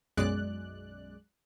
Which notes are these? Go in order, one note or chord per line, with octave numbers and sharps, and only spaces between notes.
B1 F#2 G#3 D5 F#6